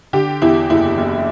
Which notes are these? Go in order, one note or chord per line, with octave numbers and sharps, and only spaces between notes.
D3 G4
E2 E4
F#1 E4
F#1